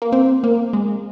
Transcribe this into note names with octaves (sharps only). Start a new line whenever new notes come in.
A#3
C4
A#3
G#3